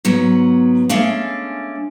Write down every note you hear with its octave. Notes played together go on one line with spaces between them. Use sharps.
G#2 F#3 B3
G#3 A3 C#4 D4 F5